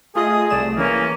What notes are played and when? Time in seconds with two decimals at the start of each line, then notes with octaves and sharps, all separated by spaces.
0.15 A3 F4 G#4 D#5 D#6
0.50 C2 A3 D5 E7
0.77 E3 A#3 C#4